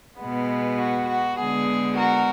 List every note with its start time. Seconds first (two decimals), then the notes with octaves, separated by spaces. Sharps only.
0.19 B2 G#3 B3
0.78 F#4
1.07 F#4
1.37 D3 G#3 B3 G#4
1.96 F#4 A#4